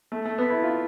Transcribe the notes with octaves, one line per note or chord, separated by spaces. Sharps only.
A3
A3
B3
E4
F4